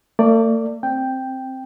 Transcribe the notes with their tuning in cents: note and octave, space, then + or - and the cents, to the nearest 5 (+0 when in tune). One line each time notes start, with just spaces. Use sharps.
A3 +45 D5 +0
C4 +5 G5 +0